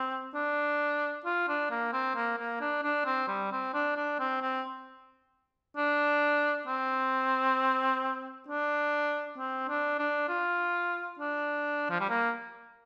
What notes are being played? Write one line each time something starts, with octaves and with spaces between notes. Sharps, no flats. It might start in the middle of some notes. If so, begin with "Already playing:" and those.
Already playing: C4
D4
F4
D4
A#3
C4
A#3
A#3
D4
D4
C4
G3
C4
D4
D4
C4
C4
D4
C4
D4
C4
D4
D4
F4
D4
F3
G3
A#3